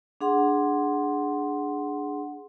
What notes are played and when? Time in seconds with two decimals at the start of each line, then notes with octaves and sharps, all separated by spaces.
0.21 D4 G#4 F#5 C6